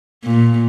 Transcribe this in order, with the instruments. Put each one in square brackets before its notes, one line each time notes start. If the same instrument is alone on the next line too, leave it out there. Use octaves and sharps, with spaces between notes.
[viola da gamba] A#2